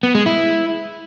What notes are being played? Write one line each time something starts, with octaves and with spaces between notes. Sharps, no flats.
B3
G#3
E4